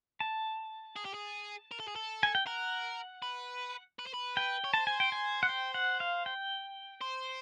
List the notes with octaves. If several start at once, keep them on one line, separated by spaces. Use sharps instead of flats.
A5
G#4
G4
G#4
A#4
A4
G#4
A4
G#5
G5
A#4 F#5
B4
B4
C5
B4
G5
C#5
C5 A5
G#5
G5
G#5
F#5
G5
F#5
F5
G5
C5